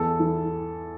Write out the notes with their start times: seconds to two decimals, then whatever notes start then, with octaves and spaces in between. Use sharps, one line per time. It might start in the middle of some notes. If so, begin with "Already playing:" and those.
Already playing: E2 A4
0.20 E3